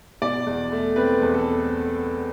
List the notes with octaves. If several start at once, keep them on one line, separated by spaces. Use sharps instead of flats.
B2 D5
E2
A3
C4 B4
E2
A4